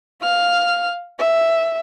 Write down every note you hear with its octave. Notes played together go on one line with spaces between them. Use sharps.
F5 F6
E5